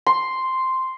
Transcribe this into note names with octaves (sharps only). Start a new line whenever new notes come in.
C6